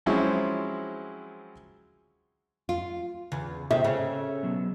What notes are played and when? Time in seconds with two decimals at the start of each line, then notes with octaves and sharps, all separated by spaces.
0.06 F3 F#3 G#3 C4 C#4 E4
2.69 F4
3.32 E2 C#3
3.71 C3 G#4 E5
3.84 C#3 A4 C#5
4.43 F#3 B3